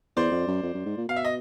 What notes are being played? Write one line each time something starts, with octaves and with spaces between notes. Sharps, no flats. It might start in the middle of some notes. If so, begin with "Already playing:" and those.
E2 C5 D5
F2
F#2
F2
F#2
G#2
A#2
B2 F5
E5
D#5